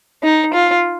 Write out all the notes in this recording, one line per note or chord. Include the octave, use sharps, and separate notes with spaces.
D#4
F4